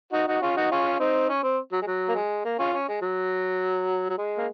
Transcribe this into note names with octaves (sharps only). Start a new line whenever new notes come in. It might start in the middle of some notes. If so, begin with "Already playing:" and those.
D#4 F#4
D#4 F#4
C#4 F4
D#4 F#4
C#4 F4
C4 D#4
C#4
C4
F#3
G#3
F#3
A#3
G#3
A#3
C#4 F4
C#4
G#3
F#3
F#3
G#3
A#3